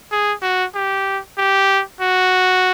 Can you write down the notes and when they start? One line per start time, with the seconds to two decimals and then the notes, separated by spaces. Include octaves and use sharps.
0.11 G#4
0.42 F#4
0.75 G4
1.38 G4
2.01 F#4